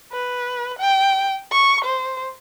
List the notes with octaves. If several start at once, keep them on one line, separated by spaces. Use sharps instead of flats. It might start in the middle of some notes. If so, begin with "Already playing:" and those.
B4
G5
C#6
C5